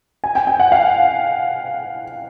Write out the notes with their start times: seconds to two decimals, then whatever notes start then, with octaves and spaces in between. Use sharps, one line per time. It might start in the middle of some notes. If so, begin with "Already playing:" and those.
0.24 G#5
0.35 G5
0.47 G5
0.60 F#5
0.72 F5